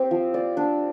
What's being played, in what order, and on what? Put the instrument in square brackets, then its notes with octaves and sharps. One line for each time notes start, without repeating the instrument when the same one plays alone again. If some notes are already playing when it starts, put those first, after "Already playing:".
Already playing: [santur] C4 G4
F3
D5
D4